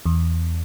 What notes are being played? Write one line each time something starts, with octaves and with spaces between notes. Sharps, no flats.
E2